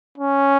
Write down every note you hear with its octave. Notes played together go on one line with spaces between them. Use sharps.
C#4